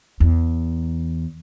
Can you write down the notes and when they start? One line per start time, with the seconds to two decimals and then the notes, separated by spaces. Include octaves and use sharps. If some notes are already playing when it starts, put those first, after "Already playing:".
0.20 E2